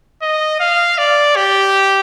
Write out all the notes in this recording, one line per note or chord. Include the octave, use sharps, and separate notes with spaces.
D#5
F5
D5
G4